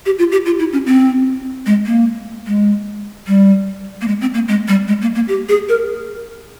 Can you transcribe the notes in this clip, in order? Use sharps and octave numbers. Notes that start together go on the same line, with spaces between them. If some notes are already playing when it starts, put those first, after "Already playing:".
G4
F4
G4
F4
E4
C#4
C4
G#3
A#3
G#3
G3
A#3
G#3
C4
A#3
G#3
G3
G#3
A#3
A#3
G4
G#4
A#4